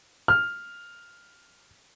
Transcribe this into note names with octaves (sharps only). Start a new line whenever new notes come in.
F6